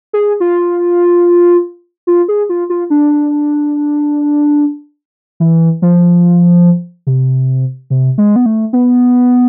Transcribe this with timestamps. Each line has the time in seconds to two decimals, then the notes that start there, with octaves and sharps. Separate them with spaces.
0.13 G#4
0.40 F4
2.07 F4
2.28 G#4
2.49 F4
2.70 F4
2.90 D4
5.40 E3
5.82 F3
7.07 C3
7.90 C3
8.18 G#3
8.36 B3
8.46 A3
8.73 B3